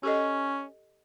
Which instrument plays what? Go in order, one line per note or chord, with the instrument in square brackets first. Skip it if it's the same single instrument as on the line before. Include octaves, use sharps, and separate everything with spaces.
[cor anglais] C#4 [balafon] G4 A4 D#5